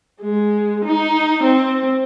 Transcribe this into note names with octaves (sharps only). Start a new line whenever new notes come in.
G#3
D#4
C4